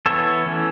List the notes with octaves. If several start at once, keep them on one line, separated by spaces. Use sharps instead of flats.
E3 B3 A4 C#5
E3 A3 C#4